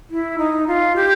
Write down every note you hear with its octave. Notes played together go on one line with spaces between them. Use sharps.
E4
D#4
F4
G4